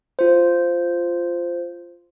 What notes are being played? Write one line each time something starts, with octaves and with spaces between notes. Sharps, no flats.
F4 C5